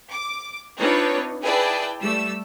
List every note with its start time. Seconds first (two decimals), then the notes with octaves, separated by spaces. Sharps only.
0.11 D6
0.78 C4 D4 D#4 F4 B4 C#5
1.42 E4 G#4 B4 D5 G5 A5
2.01 G3 A3 E6